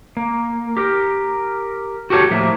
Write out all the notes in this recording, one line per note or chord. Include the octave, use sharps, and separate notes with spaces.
A#3
G4 A#4
F#4 G4 A4 A#4 C#5
A2 F3 A#3 E5